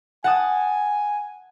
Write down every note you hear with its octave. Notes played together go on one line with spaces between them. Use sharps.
F#5 G#5 A5 D#6